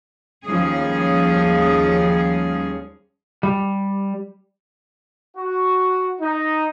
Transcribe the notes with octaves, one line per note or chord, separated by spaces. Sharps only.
D#2 F3 G3 C#4 G#4
G3
F#4
D#4